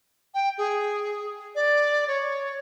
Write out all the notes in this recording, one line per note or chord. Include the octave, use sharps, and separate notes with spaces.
G5
G#4
D5
C#5